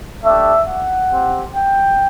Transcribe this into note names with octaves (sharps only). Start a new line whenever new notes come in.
A3 D4 G4 E5
F#5
C4 G4
G5